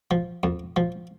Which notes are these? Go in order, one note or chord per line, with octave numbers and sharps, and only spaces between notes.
F3
F2
F3